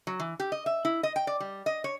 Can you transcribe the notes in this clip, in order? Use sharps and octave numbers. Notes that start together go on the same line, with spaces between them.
F#3
E3
G4
D#5
E5
E4
D#5
G5
D5
G3
D#5
C#5